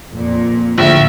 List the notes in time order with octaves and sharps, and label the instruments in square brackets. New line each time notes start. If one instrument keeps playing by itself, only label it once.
[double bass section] F2 [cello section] A#2
[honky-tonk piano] A#1 [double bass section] A2 D3 [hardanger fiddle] E5